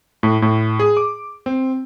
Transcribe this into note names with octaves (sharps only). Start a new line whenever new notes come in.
A2
A2
G#4
D6
C4